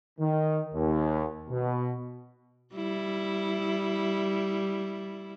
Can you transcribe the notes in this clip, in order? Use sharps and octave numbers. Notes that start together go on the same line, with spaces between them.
D#3
D#2
B2
G3 E4